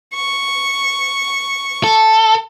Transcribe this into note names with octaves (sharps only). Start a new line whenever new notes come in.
C#6
A4